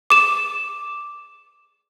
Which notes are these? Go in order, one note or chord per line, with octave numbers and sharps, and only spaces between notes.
D6 E7